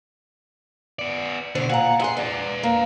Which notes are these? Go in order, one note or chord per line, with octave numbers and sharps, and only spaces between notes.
B3 D5
B2 D3 C5
A#2 F#5 A#5
E4 G#4 F#5 C6
B4 D5 F5
A#3